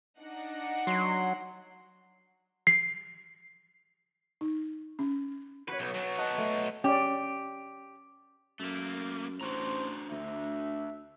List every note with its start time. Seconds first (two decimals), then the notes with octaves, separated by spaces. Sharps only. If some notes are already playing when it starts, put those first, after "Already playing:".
0.21 D4 D#4 F#5
0.87 F#3 C6
2.67 C7
4.41 D#4
4.99 C#4
5.68 F#4 B4 C#5
5.79 B1
5.95 F#3 B3
6.18 D#5 F#5 A5
6.37 A3
6.84 C#4 G4 D5
8.60 F#2 A3 A#3
9.41 A1 D4 F#4 C5 A#5
10.11 D2 E5